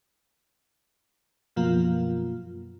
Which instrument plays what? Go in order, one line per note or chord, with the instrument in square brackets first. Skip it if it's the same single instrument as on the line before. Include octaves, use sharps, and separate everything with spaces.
[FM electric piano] F#2 B2 F3 F#3 A#3 F4